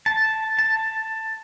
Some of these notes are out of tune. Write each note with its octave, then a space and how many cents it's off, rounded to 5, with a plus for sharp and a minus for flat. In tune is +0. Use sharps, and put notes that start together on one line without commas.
A5 +0
A5 +10